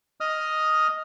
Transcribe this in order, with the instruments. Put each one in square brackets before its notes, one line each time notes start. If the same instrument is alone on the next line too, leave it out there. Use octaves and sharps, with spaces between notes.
[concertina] D#5 D#6 F6